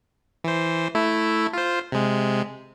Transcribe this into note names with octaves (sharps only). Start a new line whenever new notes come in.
E3 C5
A3 E4
F4 C5
C3 G#3